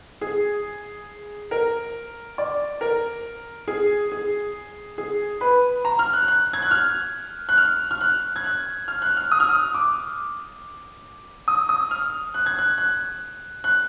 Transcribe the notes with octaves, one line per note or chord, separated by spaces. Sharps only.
G#4
A#4
D5
A#4
G#4
G#4
G#4
B4
A#5
F6
F#6
F#6
G#6
F#6
F6
F#6
F6
F6
F#6
G#6
F#6
F6
F#6
F6
D#6
F6
D#6
D6
D#6
D#6
F6
F#6
G#6
F#6
F#6
F#6